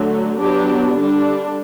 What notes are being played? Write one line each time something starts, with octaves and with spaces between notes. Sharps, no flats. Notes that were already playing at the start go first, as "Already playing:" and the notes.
Already playing: D3 F#3 A3
F#3 B3 D4 G4
D3 G3 D4